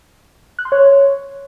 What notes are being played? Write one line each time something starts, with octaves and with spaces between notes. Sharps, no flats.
F#6
C6
C#5